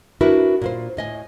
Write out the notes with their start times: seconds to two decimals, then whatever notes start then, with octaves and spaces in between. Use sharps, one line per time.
0.21 D4 E4 F#4 A#4 B4
0.62 A#2 F4 C5
0.97 A2 D#5 G#5